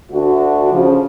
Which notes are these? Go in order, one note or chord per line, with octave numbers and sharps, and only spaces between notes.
D2 A3 D4 F#4
C#3 F3